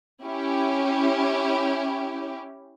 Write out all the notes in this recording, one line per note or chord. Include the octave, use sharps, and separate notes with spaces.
C#4 E4 G4